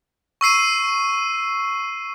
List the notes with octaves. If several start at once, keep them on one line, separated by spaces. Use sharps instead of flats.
C#6 E6 C7 D#7